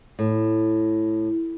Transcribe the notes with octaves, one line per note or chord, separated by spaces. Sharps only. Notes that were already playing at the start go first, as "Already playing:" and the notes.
A2